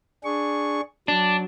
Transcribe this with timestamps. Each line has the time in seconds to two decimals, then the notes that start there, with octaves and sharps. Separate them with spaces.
0.24 D4 G#4 C#6
1.08 F#3 D4